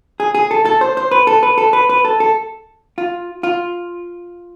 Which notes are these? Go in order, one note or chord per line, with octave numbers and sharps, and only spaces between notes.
G#4
G#4
A4
A4
C5
C5
B4
A4
B4
A4
B4
B4
A4
A4
F4
F4